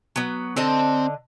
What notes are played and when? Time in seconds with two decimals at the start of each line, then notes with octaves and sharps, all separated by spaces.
0.16 F#3 B3
0.57 D3 C4 D#5 A5